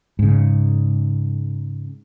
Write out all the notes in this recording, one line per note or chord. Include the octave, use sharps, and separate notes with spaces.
G#2 C#3